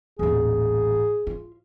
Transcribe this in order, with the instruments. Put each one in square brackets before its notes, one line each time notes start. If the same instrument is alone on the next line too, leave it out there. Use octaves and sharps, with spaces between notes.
[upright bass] D#1 A1 [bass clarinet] G#4
[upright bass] F4